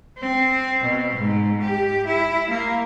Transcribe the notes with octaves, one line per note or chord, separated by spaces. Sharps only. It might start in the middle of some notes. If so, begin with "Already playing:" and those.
C4
B2
G#2
G4
E4
A#3